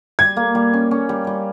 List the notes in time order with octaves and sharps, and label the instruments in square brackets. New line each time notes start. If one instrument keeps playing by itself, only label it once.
[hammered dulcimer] G3 [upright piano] G#6
[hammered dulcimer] A#3
G3
C#4
C#4
G3
G3